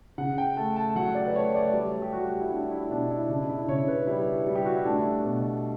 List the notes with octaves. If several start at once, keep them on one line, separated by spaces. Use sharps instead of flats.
C#3 F#5
G5
A3 A5
A5
F#3 F#5
D5
B4
A3 C#5
D5
G3 C#5
G4
G3 F#4
F#4
E4
G3 D4
E4
B2 D4
E4
C#3 D4
E4
C#3 C#5
B4
G3 E4
G3
G4
F#4
E4
A3 D4
B2